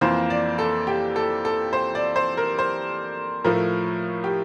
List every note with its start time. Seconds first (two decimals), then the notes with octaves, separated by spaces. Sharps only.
0.01 F2 E3 A#3 C5
0.30 D5
0.59 A4
0.87 G4
1.16 A4
1.45 A4
1.73 C5
1.95 D5
2.16 C5
2.37 A#4
2.58 C5
3.44 A2 F3 A3 A#4
4.24 G4